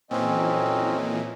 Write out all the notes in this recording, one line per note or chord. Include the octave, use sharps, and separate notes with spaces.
F2 A#2 E3 F#3 C4 C#4 D#5